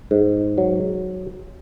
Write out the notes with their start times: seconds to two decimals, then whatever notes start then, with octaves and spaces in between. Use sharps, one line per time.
0.11 G#2
0.58 F#3